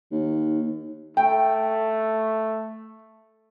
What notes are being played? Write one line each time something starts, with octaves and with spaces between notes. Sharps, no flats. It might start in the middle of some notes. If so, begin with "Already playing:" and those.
D#2
A3 G5